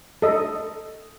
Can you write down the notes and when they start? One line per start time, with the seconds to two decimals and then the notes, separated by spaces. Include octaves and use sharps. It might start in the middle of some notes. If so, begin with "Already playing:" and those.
0.22 A4 D#5